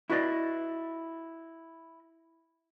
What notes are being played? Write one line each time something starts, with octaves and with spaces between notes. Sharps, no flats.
E4 F#4 B4 C5 D5 D#5